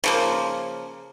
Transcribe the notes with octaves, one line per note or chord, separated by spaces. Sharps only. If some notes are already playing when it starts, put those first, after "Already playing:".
C#3 F3 A#3